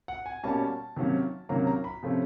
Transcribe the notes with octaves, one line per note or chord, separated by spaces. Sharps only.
F#5
G#5
B2 G3 A#3 C#4 A5
C3 D#3 F#3 A#3 C#4
C3 D#3 F#3 A#3 C#4 A#5
A#5
B5
C3 F3 A3 C#4